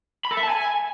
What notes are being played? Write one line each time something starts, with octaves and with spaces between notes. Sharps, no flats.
B5
A4
E5
A5
G#5